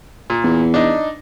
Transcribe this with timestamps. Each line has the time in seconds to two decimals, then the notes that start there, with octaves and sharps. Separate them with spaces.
0.30 A#2
0.44 E2
0.74 D4 D#4